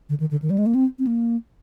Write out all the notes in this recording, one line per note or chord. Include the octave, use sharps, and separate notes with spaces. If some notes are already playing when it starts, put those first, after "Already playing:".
D3
D#3
D3
D#3
G3
G#3
A#3
C4
C4
A#3